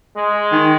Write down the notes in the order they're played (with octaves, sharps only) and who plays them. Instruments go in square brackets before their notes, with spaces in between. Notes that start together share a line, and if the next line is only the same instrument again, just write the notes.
[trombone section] G#3
[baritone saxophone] D#3